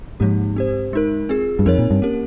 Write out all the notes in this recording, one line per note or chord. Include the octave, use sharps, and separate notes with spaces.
G#2 F3 A#3 D#4 G4
C4 G4 C5
G#3 D#4 A#4
C4 F4 G#4
G2
F2 C4 D#4 A#4 C#5
A#2
G2
A#3 C#4 G4 A#4